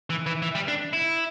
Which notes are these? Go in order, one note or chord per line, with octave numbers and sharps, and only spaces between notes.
E3
E3
E3
G3
D4
E4